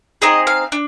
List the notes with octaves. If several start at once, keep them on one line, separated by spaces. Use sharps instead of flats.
C4 D#4 G#4 D#5
F5
D4